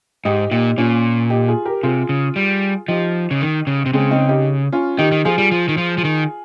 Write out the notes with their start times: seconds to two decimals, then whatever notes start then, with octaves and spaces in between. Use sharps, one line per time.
0.25 G#2 D#4 G4
0.51 A#2 D#4 G4
0.78 A#2 C#4 F4
1.30 D#4 G4
1.48 F4 G#4
1.65 G4 A#4
1.83 C3 F4 G#4
2.09 C#3
2.36 G3
2.88 F3 D#4 G4
3.31 C#3
3.41 D#3
3.67 C#3
3.86 C3
3.93 C#3 G#3 C4
4.11 C4 D#4
4.29 D#4 G4
4.72 C#4 F4
4.98 D#3 D#4 G4
5.12 D#3
5.25 F3 F4 G#4
5.38 G3
5.51 F3
5.69 D#3
5.77 F3
5.98 F3
6.04 D#3